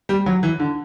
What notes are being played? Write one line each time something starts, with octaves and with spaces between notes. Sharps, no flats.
G3
F#3
E3
D3